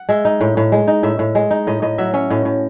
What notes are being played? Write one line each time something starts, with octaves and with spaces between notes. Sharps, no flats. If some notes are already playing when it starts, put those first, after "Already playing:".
Already playing: F#5
G#3 E5
D#4
A2
A2
G#3
D#4
A2 E5
A2
G#3
D#4
A2 D#5
A2 D#5
F#3 E5
C#4 E5
A2 D#5
A2